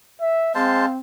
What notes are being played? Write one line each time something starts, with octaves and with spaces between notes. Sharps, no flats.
E5
G#3 C4 C5 F5 A5